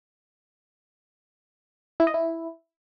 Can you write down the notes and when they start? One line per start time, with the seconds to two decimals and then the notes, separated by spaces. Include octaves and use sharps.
2.00 E4
2.07 D#5
2.14 E4